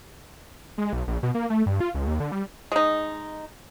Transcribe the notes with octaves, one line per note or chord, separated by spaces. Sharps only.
G#3
B1
A#1
B2
A#3
A3
G2
F4
C#2
D#2
D3
G3
G#3 D#4